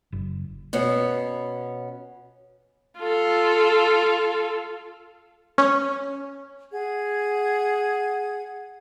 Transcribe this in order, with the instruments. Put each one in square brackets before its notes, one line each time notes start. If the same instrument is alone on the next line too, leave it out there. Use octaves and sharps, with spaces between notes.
[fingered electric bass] F#1
[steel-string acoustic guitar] B2 B3 C#4
[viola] F4 A4
[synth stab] C#4
[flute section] G#4 F#5 G#6